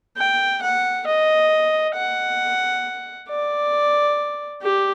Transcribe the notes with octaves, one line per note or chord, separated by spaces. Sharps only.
G5
F#5
D#5
F#5
D5
G4